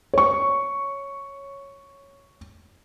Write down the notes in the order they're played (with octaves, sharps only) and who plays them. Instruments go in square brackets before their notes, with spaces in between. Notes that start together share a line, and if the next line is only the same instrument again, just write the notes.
[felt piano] C#5 C#6